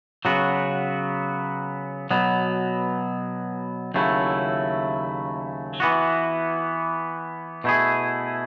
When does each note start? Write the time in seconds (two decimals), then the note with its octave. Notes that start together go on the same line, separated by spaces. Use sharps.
0.25 C#3 F#3 B3 F#4
2.11 B2 F#3 B3
3.94 D#2 C#3 F#3 A3 E4
5.80 E3 B3 F#4
7.64 B2 A3 E4 G#4